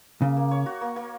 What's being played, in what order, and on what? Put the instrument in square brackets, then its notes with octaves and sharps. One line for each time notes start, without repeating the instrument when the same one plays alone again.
[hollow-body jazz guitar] C#3 [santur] A#3
[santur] A#3
C#5
F#4
A#3
A#3